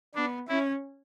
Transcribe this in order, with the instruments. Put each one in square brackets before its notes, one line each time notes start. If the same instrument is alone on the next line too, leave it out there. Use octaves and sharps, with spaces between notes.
[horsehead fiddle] B3 [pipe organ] D4
[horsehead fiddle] C#4 [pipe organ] E4